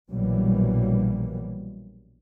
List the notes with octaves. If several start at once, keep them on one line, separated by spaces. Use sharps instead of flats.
A#1 B2 E3 F#3 G3 A#3